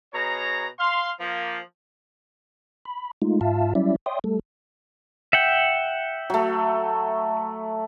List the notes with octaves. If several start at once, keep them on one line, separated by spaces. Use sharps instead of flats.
B2 G#4 C#5 A#5
F5 C6
F3 A#3
B5
G#3 A3 D#4 F4
G#2 F4 E5 F5 A5
F#3 G3 C#4 E4 D5 E5
C#5 D5 E5 G5 C6 D#6
G3 A3 A4
E5 F#5 G5
F#3 A3